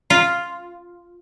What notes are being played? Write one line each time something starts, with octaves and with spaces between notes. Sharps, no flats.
F4